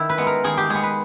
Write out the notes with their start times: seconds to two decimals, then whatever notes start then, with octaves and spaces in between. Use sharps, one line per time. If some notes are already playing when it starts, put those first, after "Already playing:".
Already playing: D#3 E4
0.09 B4
0.18 G#3 B3
0.27 A#4
0.44 D#3 G#4
0.57 G4
0.70 G#3 B3 G#4
0.83 B4